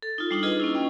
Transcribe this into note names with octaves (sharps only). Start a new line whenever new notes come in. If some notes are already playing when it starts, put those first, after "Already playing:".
A4
D#4 F4
G3 D4 D#4
F4 G#4 B4 D#5
A#3 C#4 E4
C#4 G5